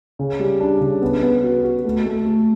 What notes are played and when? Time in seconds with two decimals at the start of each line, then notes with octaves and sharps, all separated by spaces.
0.19 C#3
0.40 G3
0.60 D4
0.80 C#3
1.02 B3
1.23 B3
1.44 F#4
1.64 F#4
1.85 A3
2.06 A3
2.26 A3